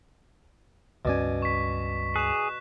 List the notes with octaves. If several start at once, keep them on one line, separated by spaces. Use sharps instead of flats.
C#2 G2 B2 C#4 D5 G#5
C#6 B6
G#4 F#6 E7